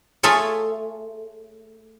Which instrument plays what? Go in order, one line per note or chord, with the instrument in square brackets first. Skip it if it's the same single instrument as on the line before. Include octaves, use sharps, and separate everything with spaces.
[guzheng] A3 F4 G#4 A4 C#5